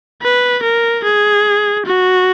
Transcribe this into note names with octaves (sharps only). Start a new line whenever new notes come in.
B4
A#4
G#4
F#4